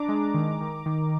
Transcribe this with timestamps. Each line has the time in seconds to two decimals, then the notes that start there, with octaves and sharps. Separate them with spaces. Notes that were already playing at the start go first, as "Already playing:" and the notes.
Already playing: D4 A#5 D6
0.08 G#3
0.34 D#3
0.61 D#3
0.86 D#3